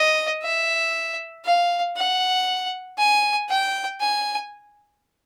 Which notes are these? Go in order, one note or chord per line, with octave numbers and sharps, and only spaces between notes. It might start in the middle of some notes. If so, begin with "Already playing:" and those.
Already playing: D#5
E5
F5
F#5
G#5
G5
G#5